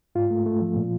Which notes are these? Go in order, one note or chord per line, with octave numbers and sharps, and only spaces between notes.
G#2 F4
A3
A3
F3
A#2